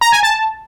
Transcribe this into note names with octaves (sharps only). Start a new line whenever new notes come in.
A#5
G#5
A5